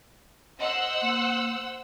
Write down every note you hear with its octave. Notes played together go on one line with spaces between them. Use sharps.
C5 D#5 F#5 E6
A#3